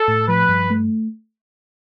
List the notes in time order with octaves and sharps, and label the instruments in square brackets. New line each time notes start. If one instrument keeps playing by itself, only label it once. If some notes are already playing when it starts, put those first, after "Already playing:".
Already playing: [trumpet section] A4
[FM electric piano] A2
[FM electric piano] F3 [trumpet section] B4
[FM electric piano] G2
A3